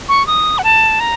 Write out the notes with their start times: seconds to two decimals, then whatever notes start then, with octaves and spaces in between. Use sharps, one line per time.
0.09 C#6
0.27 D#6
0.58 F#5
0.64 A5
1.00 A#5